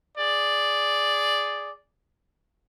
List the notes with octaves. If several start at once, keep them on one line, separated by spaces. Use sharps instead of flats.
G#4 D5